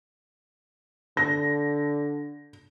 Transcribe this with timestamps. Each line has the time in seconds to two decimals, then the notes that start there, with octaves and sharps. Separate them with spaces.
1.17 D3 A#6